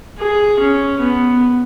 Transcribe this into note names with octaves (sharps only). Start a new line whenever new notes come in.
G#4
C#4
B3